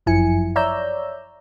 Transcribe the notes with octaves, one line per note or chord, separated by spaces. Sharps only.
G1 F#2 F3 E4 G#5 C#7
C#5 D5 E5 A#5 E6 G6